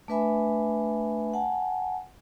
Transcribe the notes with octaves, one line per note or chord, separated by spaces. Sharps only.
A3 D4 B4 E5 G#5 B5
F#5 G#5 A5